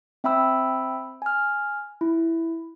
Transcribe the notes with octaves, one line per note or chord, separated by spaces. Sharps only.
C4 E5 G5 B5 E6
G#5 F6
E4